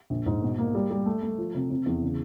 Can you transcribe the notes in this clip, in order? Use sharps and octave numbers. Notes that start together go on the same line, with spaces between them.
A#1
G#2
B2
A#3
G3
G3
A3
A3
F3
C3
C3
E2
C#3